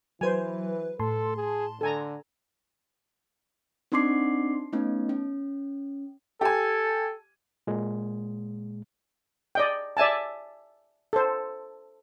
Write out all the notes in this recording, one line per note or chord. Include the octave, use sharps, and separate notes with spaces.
E3 F#3 B4 C5 G#5
A2 A4 A5 C6
G#4
D3 A4 G#5 A#5
C4 D4 D#4 C6 D6 C7
A3 B3 C#4 D#4
C#4
G4 A4 G#5
A#2 G#3
D5 D#5 G5
D5 E5 G#5 A5
A4 C5